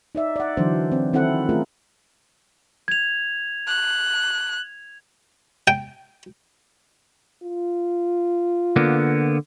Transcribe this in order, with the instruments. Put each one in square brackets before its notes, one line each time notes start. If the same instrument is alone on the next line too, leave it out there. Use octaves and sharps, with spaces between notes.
[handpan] D#4 D5 E5
D5 F#5
D3 E3 F#3 D4 C5
C4
D#3 C4 E4 A4 F#5
A3 C#4 F4 G#4 A#4
[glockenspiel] G#6 F7
[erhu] F#6
[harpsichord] G5
[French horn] F4
[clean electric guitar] D3 A#3 B3